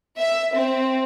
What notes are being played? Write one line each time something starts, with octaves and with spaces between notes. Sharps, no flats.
E5
C4